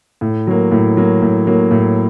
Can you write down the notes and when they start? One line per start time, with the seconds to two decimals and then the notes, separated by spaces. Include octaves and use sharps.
0.21 A2
0.47 F#3 A#3
0.72 A2
0.97 F#3 A#3
1.22 A2
1.47 F#3 A#3
1.71 A2